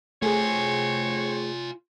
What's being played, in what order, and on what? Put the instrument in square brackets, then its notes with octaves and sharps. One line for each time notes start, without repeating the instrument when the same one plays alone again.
[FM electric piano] A3 G#4 [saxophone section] C4 F#4 C#5 [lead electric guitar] F4 G#5